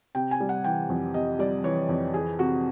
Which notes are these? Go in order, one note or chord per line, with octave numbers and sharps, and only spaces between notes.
C3 G5
G#5
G3
F#5
E3 G5
F2
C3 D#5
G3 D5
E3 C#5
F2
E3 G#4
C3 F#4